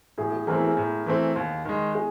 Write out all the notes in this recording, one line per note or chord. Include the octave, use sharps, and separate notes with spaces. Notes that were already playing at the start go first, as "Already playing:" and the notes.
A2 G#4
G#4
E3 A3 C4 G#4 A#4
G#4
A2
E3 A3 C4
D#2
D#3 G#3
G#4